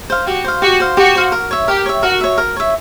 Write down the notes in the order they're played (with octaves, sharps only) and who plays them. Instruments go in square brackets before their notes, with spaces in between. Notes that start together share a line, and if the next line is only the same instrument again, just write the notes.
[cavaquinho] C5 F5
[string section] F#4 [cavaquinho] G4
[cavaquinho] C5 F5
[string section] F#4 [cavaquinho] G4
[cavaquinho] C5 F5
[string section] F#4 [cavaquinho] G4
[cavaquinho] C5 F5
A#4
C#5 E5
[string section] G4 [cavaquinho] A#4
[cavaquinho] C#5 E5
[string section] F#4 [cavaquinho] A#4
[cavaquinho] C#5 E5
A#4
C#5 E5